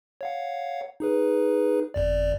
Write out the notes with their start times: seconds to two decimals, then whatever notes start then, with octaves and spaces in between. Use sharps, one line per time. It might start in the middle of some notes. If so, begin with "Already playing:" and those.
0.21 C#5 F5 F#5
1.00 D#4 G#4 B4
1.94 G1 F2 D5